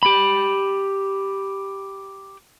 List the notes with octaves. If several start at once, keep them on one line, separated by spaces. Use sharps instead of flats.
G4 B5